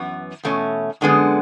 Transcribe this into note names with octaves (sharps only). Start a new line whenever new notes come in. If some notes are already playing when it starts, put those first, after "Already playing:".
Already playing: F#2 E3 B3
E2 B2 A3 C#4
F#2 D3 G#3 B3